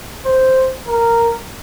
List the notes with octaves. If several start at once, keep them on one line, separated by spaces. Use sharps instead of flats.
C5
A#4